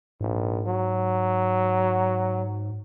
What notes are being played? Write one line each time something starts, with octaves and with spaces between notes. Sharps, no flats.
A#1 G#2
F#3